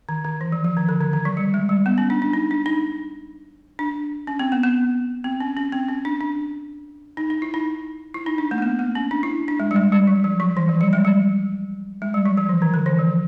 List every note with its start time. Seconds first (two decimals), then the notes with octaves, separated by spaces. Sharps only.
0.09 D#3
0.24 D#3
0.41 E3
0.52 F3
0.64 F3
0.77 D#3
0.89 D3
1.01 D#3
1.13 D#3
1.25 F#3
1.37 G3
1.54 G#3
1.69 G3
1.86 B3
1.98 C#4
2.10 D4
2.22 D4
2.33 D#4
2.51 D4
2.66 D#4
3.79 D4
4.27 C#4
4.39 C4
4.52 B3
4.63 B3
5.24 C4
5.40 C#4
5.57 C#4
5.72 C4
5.89 C#4
6.05 D4
6.21 D4
7.17 D#4
7.30 D#4
7.42 E4
7.54 D#4
8.14 E4
8.26 D#4
8.38 D4
8.51 A3
8.58 A#3
8.62 B3
8.79 A#3
8.95 C#4
9.11 D4
9.23 E4
9.48 D4
9.60 G#3
9.71 G3
9.76 G#3
9.92 G3
10.07 F#3
10.24 F3
10.40 F#3
10.57 E3
10.69 F3
10.81 G3
10.93 G#3
11.05 G3
12.02 G#3
12.14 G3
12.25 F#3
12.37 F3
12.49 E3
12.62 D#3
12.74 D3
12.86 E3
12.99 F3